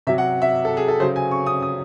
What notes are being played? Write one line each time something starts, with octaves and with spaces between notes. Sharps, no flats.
C3 F#3 E5
F#5
E5
A4
G#4
A4
C#3 F#3 C5
G#5
C#6
D#6
D#6